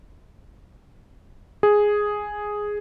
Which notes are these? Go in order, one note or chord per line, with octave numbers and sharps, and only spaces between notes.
G#4